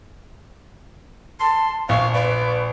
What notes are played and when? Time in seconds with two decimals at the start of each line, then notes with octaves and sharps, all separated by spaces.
1.40 A5 C6
1.89 A#1 F5 C#6
2.14 B4 D5